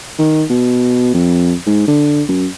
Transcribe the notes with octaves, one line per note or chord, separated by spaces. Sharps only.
D#3
B2
F2
G#2
D3
F#2